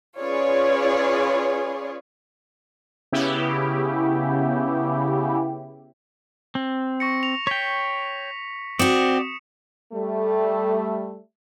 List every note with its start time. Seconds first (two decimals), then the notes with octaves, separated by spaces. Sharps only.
0.20 C#4 F4 G#4 B4 C#5 D5
3.12 C#3 B3 E4 G4
6.55 C4
7.00 C#6 A#6 C#7
7.23 F7
7.47 C#5 G5 B6
8.79 C4 F#4 D5 D#6 C#7 E7
9.93 G3 A3